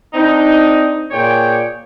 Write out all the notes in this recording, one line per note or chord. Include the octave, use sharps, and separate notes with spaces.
C4 D4 D#4
A#2 G#4 C#5 D5 G5